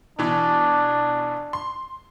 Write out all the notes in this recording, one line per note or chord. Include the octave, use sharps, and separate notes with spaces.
B2 E3 D4
C6